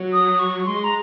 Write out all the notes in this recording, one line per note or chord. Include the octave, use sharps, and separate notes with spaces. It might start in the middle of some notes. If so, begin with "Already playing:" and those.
Already playing: F#3
D#6
C#6
G#3 C6
A#5